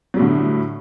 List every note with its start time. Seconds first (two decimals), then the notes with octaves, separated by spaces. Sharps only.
0.14 F#3
0.17 G3
0.19 A2
0.22 D3